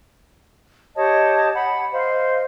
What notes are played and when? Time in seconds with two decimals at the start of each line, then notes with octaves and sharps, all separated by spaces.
0.96 G4 C#5 D#5 A5
1.54 F#5 B5
1.93 C5 D#5 F5